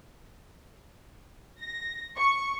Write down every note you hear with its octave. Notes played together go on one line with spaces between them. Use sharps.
A#6
C#6